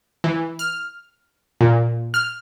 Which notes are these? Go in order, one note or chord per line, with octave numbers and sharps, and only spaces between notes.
E3
F6
A#2
F6